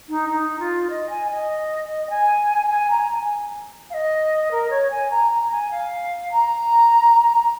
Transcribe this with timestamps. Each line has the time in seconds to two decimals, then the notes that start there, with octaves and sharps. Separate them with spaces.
0.09 D#4
0.29 D#4
0.59 F4
0.89 D#5
1.09 G#5
1.30 D#5
2.09 G#5
2.70 G#5
2.90 A#5
3.10 A#5
3.14 G#5
3.90 F5
3.94 D#5
4.51 A#4
4.70 C#5
4.90 G#5
5.10 A#5
5.30 A#5
5.51 G#5
5.71 F5
6.31 A#5